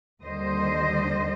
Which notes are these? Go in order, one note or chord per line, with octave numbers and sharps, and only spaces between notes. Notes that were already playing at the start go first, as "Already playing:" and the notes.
D#2 D3 G3 C5 D#5